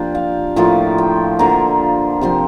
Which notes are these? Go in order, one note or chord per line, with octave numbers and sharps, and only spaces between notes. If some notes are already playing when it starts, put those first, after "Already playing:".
Already playing: F3 A#3 D4 F4 G4
F5
A2 F3 A#3 F4 A5
G5
D3 F3 A#3 A#5
C3 F3 C4 C6